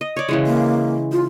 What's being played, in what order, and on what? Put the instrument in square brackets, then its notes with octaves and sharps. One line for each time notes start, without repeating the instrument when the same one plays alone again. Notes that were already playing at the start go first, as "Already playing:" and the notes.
[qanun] D#5
C#5 D5
C#3 E3 G#3
[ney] A#3
F4